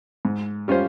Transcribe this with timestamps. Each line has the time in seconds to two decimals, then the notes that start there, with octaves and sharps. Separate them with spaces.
0.25 G#2
0.68 G3 C#4 F4 C5